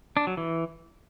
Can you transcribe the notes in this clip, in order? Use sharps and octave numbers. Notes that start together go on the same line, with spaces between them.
D4
F#3
E3